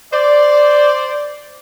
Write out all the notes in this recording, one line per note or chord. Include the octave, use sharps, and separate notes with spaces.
C5 D5